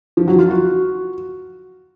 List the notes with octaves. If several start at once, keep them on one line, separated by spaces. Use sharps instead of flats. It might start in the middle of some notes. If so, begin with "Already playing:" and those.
F3
F#3
F4
F#4